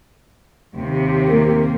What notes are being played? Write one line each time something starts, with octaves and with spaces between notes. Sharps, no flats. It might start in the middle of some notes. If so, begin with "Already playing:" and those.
D#2 C3
A#3